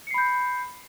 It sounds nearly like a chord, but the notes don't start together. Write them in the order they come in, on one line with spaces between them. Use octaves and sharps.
C#7 C7 B5 G6